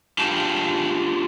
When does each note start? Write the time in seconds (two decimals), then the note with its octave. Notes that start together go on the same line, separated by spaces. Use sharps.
0.18 D4 F4 G4 G#4 G5 A5